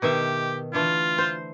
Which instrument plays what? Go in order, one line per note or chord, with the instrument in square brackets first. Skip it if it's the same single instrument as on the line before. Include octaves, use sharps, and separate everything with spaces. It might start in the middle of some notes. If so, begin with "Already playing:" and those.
[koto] B2 D#3 E5 [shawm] G4
[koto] D3 E3 A3 [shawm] F4
[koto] C5